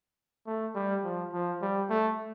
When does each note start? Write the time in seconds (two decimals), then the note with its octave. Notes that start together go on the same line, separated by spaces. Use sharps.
0.47 A3
0.75 G3
1.04 F3
1.33 F3
1.62 G3
1.90 A3